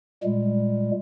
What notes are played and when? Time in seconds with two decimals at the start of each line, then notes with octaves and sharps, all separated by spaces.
0.23 A#2 G3 G#3